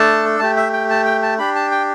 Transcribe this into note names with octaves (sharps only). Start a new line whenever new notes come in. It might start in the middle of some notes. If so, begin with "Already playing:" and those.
Already playing: A3 D4 A4 A5
A3 G4 A5
E5
G5
A5
G5
A5
D4 G4 B5
A5
G5